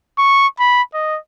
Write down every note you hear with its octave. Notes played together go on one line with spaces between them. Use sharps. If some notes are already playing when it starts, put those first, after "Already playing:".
C#6
B5
D#5